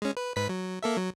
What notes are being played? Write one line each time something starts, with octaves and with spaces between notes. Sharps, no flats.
G#3 C#4
B4
G#2 B4 B6
F#3
A#3 A4 E5
F#3